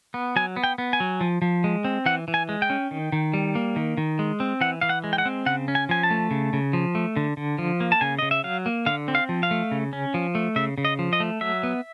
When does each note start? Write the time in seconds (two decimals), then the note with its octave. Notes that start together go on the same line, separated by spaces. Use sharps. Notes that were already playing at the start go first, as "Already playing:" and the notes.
0.14 B3
0.36 F#3 G#5
0.56 B3
0.64 G5
0.78 B3
0.93 G#5
1.00 F#3
1.21 F3
1.42 F3
1.64 G#3
1.84 C4
2.06 E3 F#5
2.28 E3
2.34 G#5
2.49 G#3
2.62 G5
2.70 C#4
2.91 D#3
3.12 D#3
3.34 G3
3.55 A#3
3.76 D#3
3.97 D#3
4.19 G#3
4.40 C4
4.61 E3 F#5
4.81 E3 F5
4.89 F#5
5.04 G#3
5.13 G5
5.18 F#5
5.25 C4
5.46 C#3 F#5
5.68 C#4
5.75 G#5
5.89 F3 G#5
6.03 A5
6.11 A3
6.31 C#3
6.53 C#3
6.73 F3
6.95 A3
7.16 D3
7.37 D3
7.58 F3
7.80 A#3
7.92 A5
8.01 C#3 G#5
8.19 C#3 D#5
8.31 E5
8.44 F#3 F5
8.66 A#3
8.86 D3 F5
9.08 C4
9.15 F5
9.29 F3
9.43 F5
9.51 A3
9.71 C#3
9.93 C#4
10.14 F3
10.35 A3
10.56 C#3 E5
10.78 C#3
10.85 D#5
10.99 F3
11.13 D#5
11.20 A3
11.41 F#3 E5
11.63 B3